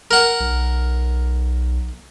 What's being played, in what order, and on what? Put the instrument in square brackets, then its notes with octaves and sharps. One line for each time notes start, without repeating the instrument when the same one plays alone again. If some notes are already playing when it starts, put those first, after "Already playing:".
[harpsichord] A#4 F#5
[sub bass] B1